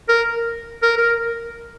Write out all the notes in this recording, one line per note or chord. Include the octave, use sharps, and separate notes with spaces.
A#4
A#4
A#4